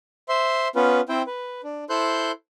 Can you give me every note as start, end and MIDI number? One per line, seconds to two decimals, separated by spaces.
0.29 0.68 72
0.29 0.68 76
0.29 0.68 84
0.75 1.01 59
0.75 1.01 61
0.75 1.01 65
0.75 1.01 71
1.09 1.22 60
1.09 1.22 64
1.09 1.22 72
1.09 1.22 79
1.27 1.61 71
1.64 1.84 62
1.90 2.32 64
1.90 2.32 69
1.90 2.32 72
1.90 2.32 84
1.90 2.32 90
1.90 2.32 91